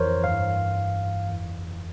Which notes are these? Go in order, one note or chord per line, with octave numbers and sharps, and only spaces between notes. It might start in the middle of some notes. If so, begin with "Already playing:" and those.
Already playing: F2 E3 A#4 C5 C#5
G2 E3 F5
F2 E3